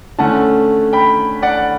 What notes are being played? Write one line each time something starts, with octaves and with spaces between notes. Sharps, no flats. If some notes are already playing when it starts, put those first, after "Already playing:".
D3 A3 C#4 F#5 A5
G5 B5
D5 F#5